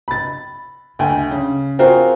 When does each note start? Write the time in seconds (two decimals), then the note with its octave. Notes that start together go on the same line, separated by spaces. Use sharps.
0.08 B5 A6
0.99 D2 G5 G#5
1.31 C#3
1.79 C4 F4 F#4 G#4 A#4 C5